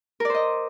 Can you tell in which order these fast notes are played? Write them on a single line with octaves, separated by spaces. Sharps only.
A#4 D5 C5 D#5